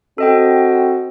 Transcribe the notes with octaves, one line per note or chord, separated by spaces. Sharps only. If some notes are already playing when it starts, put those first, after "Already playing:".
C4 F#4 A4 D#5 G5